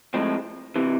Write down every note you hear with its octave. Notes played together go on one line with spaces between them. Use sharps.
A2 F3 G#3 C4
C3 E3